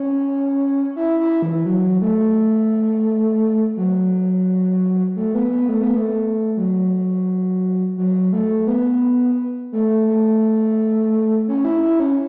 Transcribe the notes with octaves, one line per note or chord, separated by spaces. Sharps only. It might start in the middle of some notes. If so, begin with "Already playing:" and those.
Already playing: C#4
E4
E4
E3
F#3
A3
F#3
A3
B3
B3
A3
B3
A3
F#3
F#3
A3
B3
A3
A3
C#4
E4
E4
C#4